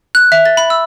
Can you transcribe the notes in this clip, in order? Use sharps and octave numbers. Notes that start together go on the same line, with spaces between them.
F#6
E5
A6
B5
E6